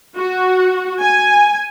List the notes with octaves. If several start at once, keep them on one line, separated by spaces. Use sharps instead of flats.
F#4
G#5